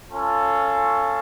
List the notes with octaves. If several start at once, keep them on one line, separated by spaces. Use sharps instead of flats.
C#4 F4 A4